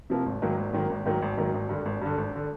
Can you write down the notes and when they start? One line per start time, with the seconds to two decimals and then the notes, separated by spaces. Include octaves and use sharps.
0.10 C3 F3 A#3
0.26 G#1
0.42 G#2 D#3 F#3 A#3
0.57 G#1
0.73 G#2 D#3 F#3 A#3
0.89 G#1
1.06 G#2 D#3 F#3 A#3
1.22 G#1
1.38 G#2 D#3 F#3 A#3
1.53 G#1
1.69 G2 D3
1.85 G#1
2.02 G2 D3
2.18 G#1
2.36 D3